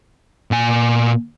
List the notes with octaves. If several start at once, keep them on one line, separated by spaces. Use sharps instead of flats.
A#2 G#5